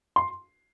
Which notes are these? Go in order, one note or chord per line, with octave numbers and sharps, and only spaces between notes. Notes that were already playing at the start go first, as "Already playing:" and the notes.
C6